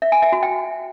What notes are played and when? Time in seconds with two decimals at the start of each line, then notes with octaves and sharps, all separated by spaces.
0.02 E5
0.12 G#5
0.22 E5
0.32 F#4
0.43 G5